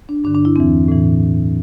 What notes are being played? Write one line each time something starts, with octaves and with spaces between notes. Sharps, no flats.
D4
G2 D3 D4
D4
E4
E2 E3 C4
A2 E3